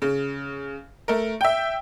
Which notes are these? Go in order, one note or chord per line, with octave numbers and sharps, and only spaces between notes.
C#3
A3 A#4
E5 G5